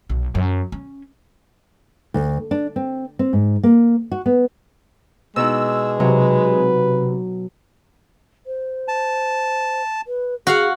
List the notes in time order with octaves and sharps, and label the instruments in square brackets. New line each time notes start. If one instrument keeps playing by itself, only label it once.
[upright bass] B1
F#2
C#4
[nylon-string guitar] D2
D4
C4
C4
G#2
A#3
F#4
B3
[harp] B2 D#4 E4 [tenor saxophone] G#3 [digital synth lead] E6
[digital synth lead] C3 [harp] F#3 [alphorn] B4
[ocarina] C5
[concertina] A5
[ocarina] B4
[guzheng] F#4 F5 F#5 [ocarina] G#4